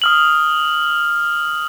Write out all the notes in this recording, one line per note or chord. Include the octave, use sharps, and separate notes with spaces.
D#6 F6 F#7